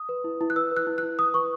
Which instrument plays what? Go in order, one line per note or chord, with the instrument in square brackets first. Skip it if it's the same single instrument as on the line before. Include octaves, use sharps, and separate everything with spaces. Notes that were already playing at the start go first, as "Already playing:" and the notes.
Already playing: [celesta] D#6
B4
E4
E4
F#6
B4 E6
B4
F#6
E4
E4 F#6
B4 D#6
B4 C#6